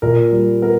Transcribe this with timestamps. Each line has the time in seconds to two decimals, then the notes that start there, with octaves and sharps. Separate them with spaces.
0.02 A#2 A#4
0.32 G3
0.62 B3 A#4